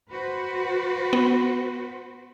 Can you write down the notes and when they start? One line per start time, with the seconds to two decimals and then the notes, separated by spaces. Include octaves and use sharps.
0.10 F#4 B4 C5
1.13 B3